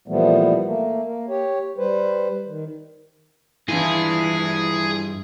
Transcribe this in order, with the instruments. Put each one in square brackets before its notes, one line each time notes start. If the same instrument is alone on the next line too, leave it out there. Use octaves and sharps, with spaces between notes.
[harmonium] A#2 E3 F3 G3 A3 B3
A3 A#3
A#3
G4 C#5
G3 B4 C5
D#3
[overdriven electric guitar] G2 F4 [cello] E3 [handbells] D4 E4 [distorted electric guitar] G#4